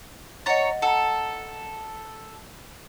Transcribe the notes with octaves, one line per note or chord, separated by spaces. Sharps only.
C#5 D#5 F#5 A#5 A6
A4 F#5 A#5